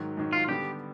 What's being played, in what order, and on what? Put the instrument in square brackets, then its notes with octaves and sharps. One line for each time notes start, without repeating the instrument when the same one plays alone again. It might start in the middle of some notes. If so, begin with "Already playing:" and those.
Already playing: [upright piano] G#2 D#3 F#3
G#2 D#3 F#3
[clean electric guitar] F4
[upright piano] D3 G3 B3 [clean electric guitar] G4